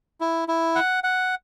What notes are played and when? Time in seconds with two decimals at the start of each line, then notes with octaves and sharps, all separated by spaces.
0.21 E4
0.48 E4
0.75 F#5
1.04 F#5